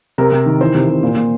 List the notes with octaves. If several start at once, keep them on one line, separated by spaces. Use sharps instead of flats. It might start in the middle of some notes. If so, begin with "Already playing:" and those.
C3 A#4
C3
D#3
E3 C5
C3
C3
A#2
A#2